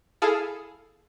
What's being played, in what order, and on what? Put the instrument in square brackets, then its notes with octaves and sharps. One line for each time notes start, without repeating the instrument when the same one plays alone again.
[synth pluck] E4 G#4 A4 F5